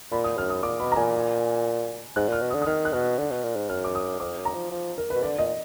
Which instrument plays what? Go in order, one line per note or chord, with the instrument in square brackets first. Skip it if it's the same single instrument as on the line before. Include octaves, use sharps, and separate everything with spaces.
[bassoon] A#2 [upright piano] B5
[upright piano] D#6
[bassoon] F#2 [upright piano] F6
[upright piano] D#6
[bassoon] A#2 [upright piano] D6
[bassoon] B2 [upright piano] B5
[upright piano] A#5
[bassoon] A#2 [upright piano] G#5
[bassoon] G#2 [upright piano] F#6
[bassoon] A#2 [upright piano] F6
[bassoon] B2
[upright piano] D#6
[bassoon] D3
[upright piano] D#6
[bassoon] D#3 [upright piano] F6
[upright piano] F#6
[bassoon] B2 [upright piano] F6
[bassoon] D3
B2
A#2
G#2
[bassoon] F#2 [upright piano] F6
[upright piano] D6
D#6
[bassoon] F2 [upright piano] D6
[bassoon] F#2
[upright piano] A#5
[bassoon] F3
F3
[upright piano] A#4
[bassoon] B2 [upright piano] B4
[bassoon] D3 [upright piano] D5
[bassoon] A#2 [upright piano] D#5